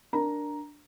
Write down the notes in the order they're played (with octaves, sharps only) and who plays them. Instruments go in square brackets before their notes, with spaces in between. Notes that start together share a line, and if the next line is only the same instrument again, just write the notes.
[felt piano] D4 A#4 A#5